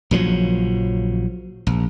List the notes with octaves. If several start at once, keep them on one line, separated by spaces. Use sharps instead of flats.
A#1 C#3 F3 F#3
A#1